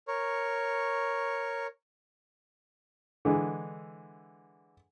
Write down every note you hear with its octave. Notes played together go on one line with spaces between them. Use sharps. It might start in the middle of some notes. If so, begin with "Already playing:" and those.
A#4 C#5 C#6
D3 E3 G#3